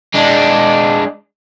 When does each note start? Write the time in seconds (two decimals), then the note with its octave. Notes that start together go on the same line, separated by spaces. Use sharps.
0.15 G#3 D4